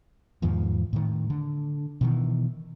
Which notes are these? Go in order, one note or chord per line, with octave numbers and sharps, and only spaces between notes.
E2 G#2 D#3 F3
A2 D#3
D3
B2 D#3 E3